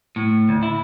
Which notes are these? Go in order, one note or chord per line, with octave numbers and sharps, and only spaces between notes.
A2
D2
E4